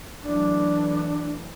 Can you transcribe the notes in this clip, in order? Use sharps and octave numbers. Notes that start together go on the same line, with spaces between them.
E3 F#3 A3 D4